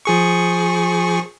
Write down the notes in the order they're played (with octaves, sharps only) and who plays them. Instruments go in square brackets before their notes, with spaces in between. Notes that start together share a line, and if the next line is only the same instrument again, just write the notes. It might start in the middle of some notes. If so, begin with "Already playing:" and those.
[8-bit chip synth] F3 G#4 C#6